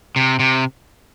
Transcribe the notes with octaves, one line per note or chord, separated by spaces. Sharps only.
C3
C3